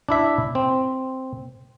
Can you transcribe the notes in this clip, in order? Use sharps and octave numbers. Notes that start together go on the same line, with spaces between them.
D4 E4 E5
C4